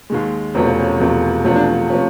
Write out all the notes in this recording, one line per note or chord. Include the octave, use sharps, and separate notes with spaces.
D#2 D#3 G#3
E1 E2 C3 F3 A3 C#4
C4
C#4
E1 E2 C3 F3 A3
E1 E2 C3 F3 A3 C#4
D4
C3 F3 A3 C#4